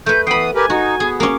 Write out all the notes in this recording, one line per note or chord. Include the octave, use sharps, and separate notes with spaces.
A3 B4 G6
E3 B3 G5 B5 D#6 C7
G4 A#4 B4 G#5
D#4 F#4
B3 G#4
A#3 C#4 D6